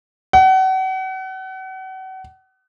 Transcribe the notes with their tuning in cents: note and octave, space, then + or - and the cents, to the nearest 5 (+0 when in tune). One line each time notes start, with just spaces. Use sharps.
F#5 +35